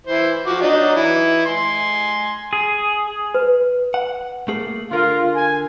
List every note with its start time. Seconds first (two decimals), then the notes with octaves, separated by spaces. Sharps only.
0.07 E3 E4 C5
0.46 F3 F#4 D6
0.61 F#3 D4 D#4
0.95 E3 E4
1.46 G#5 C6
2.53 G#4
3.34 B4
3.94 F#5
4.48 A3 A#3 G#4
4.91 D3 F4 A#4
5.35 G#5